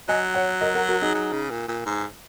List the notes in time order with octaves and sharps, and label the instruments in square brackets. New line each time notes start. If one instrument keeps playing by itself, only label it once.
[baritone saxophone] F#3 [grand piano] D#5 G#5
[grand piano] C#5 F#5
A#4 D#5
F#4 A#4
F#4 A#4
D#4 G#4
[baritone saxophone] F#3
C#3
A#2
A#2
G#2